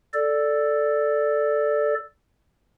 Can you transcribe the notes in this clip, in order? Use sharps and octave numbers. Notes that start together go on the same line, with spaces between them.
A4 D5